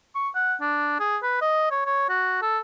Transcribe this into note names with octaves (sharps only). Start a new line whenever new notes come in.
C#6
F#5
D4
G#4
B4
D#5
C#5
C#5
F#4
A4